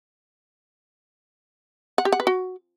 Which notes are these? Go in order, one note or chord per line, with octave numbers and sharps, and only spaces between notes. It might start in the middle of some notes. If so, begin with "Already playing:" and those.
F#5
G4
F#5
B4
F#4